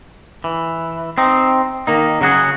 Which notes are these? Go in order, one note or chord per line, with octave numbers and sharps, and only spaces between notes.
E3
C4 D#4
D#3 A#3 D#4
C#3 F#3 F#4 G#4